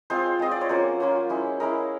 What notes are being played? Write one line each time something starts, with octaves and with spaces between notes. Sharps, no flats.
G#3 C4 F4 C5
G#3 C4 F4 D#5
D5
C#5
F#3 A#3 C#4 F4 C5
F#3 A#3 C#4 F4
G#3 C#4 E4
G#3 C#4 E4 A#4